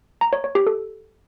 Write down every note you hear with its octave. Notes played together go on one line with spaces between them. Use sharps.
A#5
C#5
C#5
G4
A4